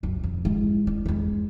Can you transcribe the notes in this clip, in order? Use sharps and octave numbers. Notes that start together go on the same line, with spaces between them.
C#2 F#2
F2
G#3 E4
D4
E2 G#3